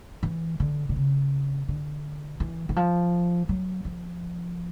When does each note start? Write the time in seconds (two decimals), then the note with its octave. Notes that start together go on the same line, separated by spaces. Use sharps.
0.23 E3
0.60 D3
0.89 D3
0.96 C#3
1.69 D3
2.40 E3
2.69 E3
2.76 F3
3.49 F#3
3.85 F3